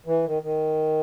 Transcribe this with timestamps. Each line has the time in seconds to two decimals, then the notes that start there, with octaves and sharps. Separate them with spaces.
0.06 E3
0.25 D#3
0.42 D#3